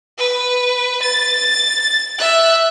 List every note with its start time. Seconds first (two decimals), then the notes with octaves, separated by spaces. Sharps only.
0.18 B4
1.02 A6
2.19 E5 F#6